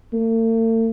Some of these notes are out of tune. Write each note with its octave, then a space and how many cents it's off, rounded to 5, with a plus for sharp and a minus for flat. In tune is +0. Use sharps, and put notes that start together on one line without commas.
A3 +45